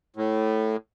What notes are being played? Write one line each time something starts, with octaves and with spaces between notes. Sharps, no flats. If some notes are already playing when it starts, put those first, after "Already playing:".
A2